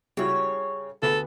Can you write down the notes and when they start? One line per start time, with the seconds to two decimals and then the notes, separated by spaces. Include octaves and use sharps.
0.17 C#3 G3 E4 F#4 C#5
1.03 D2 B3 A4 B5